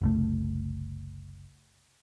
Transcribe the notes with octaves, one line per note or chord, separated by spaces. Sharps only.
F#1 C2 A3